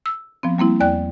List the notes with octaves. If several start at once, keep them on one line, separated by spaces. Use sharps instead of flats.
E6
F3 B3 C4
G3 A#3 C4 E4
E2 D5 G5 F#6